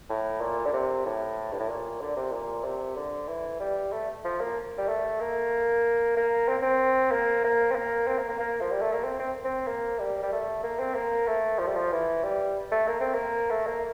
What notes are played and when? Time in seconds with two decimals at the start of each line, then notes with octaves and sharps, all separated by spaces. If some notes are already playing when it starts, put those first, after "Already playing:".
0.10 A2
0.41 A#2
0.66 D3
0.73 C3
1.05 A2
1.52 G2
1.60 A2
1.69 A#2
2.01 D3
2.17 C3
2.33 A#2
2.64 C3
2.96 D3
3.29 E3
3.60 G3
3.93 A3
4.25 F3
4.41 A#3
4.78 G3
4.88 A3
5.21 A#3
6.17 A#3
6.49 C4
6.62 C4
7.12 A#3
7.44 A#3
7.71 C4
7.76 A#3
8.08 C4
8.19 A#3
8.29 A#3
8.40 A#3
8.61 F3
8.72 G3
8.82 A3
8.93 A#3
9.04 C4
9.20 C4
9.45 C4
9.68 A#3
10.00 G3
10.23 G3
10.32 A3
10.63 A#3
10.80 C4
10.95 A#3
11.27 A3
11.59 F3
11.68 G3
11.76 F3
11.92 E3
12.24 G3
12.72 A3
12.87 A#3
13.01 C4
13.15 A#3
13.51 A3
13.67 A#3